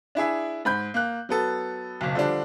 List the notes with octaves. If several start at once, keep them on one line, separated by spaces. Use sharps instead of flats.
D4 E4 G#4 E5
G#2 B5 G6
A#3 F#6
F#3 B3 A4
F#1 B1
D3 F3 G3 D4